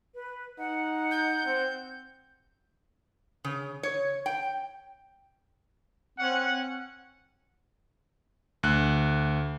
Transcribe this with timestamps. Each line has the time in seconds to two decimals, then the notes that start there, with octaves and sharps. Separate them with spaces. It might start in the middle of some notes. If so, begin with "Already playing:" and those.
0.15 B4
0.59 D#4 F#5
1.11 G6
1.45 C4
3.44 C#3
3.83 C#5
4.26 G5
6.19 C4 C#4 F#5
8.63 D2 F#6